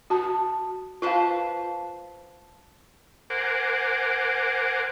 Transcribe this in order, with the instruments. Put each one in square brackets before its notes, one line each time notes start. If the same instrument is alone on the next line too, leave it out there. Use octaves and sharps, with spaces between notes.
[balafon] F#4 A5
[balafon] F4 F5 [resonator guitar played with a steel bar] B4 C5 A5
[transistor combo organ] A#4 C5 F#5 G#5 D6